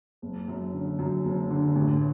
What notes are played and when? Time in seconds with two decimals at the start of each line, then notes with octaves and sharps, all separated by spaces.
0.22 F#1
0.48 F#2
0.74 D3
0.99 F#2
1.25 F#1
1.50 D3
1.75 A1